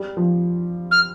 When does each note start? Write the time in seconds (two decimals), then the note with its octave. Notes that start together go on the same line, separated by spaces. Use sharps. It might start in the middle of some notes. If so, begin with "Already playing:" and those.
Already playing: G3
0.17 F3
0.91 F6